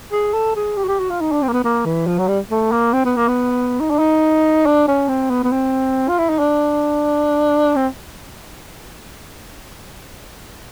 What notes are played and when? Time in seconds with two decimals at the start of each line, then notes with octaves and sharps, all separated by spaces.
0.12 G#4
0.34 A4
0.56 G#4
0.77 G4
0.84 F#4
0.88 G4
0.99 F#4
1.10 F4
1.21 D#4
1.32 D4
1.43 C4
1.49 A#3
1.53 B3
1.64 A#3
1.85 E3
2.07 F3
2.19 F#3
2.28 G3
2.51 A3
2.72 A#3
2.93 C4
3.05 B3
3.17 A#3
3.28 B3
3.81 D#4
3.90 D4
3.99 D#4
4.66 D4
4.88 C#4
5.09 C4
5.30 B3
5.44 B3
5.52 C4
6.09 F4
6.19 E4
6.30 D#4
6.39 D4
7.76 C4